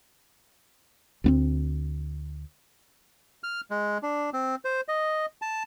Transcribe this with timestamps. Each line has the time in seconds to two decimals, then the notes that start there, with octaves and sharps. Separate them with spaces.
1.24 D2 B3 C4
3.44 F6
3.71 G#3
4.03 D4
4.33 C4
4.65 C5
4.88 D#5
5.42 A5